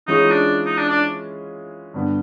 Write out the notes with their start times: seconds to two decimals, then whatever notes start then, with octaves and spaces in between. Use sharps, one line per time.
0.08 E3 G#3 C#4 D#4 F4 G#4
0.31 D4
0.66 D#4
0.78 D4
0.89 D4
1.94 G2 D3 G3 B3